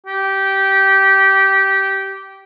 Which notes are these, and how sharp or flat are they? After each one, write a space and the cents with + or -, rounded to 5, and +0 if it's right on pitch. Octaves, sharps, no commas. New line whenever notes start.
G4 -15